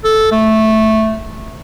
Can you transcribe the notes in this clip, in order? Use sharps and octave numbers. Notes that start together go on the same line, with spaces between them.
A4
A3